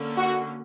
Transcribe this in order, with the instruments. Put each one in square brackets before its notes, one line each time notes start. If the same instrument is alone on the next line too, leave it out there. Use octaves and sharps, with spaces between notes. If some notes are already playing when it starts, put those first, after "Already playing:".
Already playing: [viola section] D3 A#3 C#4
[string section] F#4